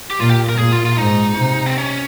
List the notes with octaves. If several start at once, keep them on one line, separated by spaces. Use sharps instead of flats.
G4
A#2 F4
G4
A#4
A#2 G#4
F4
F4
G#2 D#4
C3
C4
C#4